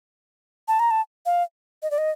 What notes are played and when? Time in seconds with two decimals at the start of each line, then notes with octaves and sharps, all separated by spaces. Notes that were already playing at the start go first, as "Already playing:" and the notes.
0.68 A5
0.79 A#5
0.91 A5
1.26 F5
1.82 D#5
1.91 D5
1.98 D#5